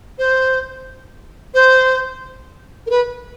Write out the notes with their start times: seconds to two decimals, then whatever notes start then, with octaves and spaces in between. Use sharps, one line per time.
0.18 C5
1.54 C5
2.86 A#4
2.90 B4